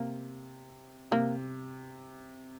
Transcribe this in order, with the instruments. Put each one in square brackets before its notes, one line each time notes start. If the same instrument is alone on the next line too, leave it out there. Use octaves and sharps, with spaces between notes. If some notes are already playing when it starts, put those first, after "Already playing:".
Already playing: [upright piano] C3 [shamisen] A#3
[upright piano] C3 [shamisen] A#3